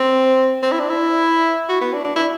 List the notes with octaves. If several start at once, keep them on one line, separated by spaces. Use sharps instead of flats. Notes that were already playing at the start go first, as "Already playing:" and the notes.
Already playing: C4
C4
E4
D4
E4
F#4
B3
D4
D4
E4